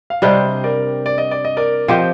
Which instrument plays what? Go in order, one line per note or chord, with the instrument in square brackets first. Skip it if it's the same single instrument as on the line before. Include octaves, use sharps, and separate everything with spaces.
[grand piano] F5
[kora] C3 G3 D4 [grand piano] C5 D#5
[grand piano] A#4 D5
D5
D#5
D5
D#5
A#4 D5
[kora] F3 C4 G4 [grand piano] C5 D#5